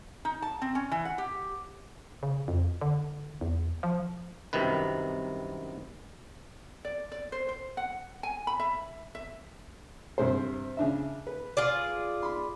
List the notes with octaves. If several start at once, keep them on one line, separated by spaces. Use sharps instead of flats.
D#4
A5
C4
C#4
E3
F#5
G4
C#3
F2
D3
E2
F3
C2 F#2 C3 D#3 B4
D5
D5
C5
C5
F#5
G#5
B5
E5
E5
G2 C3 C5
C#3 D4 E5
B4
F4 G#4 D5
B5 C6